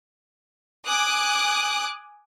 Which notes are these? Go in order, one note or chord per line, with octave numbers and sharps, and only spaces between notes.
G#5 D6 D#6 F#6